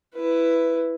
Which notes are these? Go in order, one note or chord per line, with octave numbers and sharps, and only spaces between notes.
E4 B4